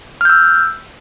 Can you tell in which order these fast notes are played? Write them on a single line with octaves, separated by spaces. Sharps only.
F6 G6 E6